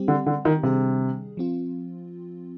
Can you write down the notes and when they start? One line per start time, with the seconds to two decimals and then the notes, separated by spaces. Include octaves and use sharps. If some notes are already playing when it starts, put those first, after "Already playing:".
Already playing: G3 C4 G4
0.08 D3
0.26 D3
0.45 D#3
0.63 C3 D#3 G3 D4 G#4
1.37 F3 C4 F4